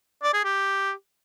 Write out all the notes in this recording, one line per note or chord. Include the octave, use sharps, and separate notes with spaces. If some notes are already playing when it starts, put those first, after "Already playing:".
D5
G#4
G4